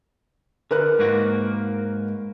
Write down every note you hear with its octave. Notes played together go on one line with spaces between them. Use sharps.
D3 A#4 B4 F#6
G#2 A#3 F#4